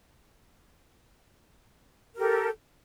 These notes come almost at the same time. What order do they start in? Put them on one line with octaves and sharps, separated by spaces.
A#4 G4 A4